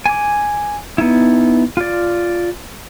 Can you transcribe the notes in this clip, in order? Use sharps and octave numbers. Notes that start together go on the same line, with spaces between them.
G#5 D6
B3 D#4 E4
F4 D5